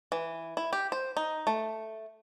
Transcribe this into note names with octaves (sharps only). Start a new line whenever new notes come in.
E3
E4
G4
C5
D#4
A3